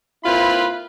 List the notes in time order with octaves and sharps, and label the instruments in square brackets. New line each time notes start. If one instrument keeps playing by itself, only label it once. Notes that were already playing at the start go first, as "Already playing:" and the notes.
[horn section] A#2 C4 E4 F4 B4 B5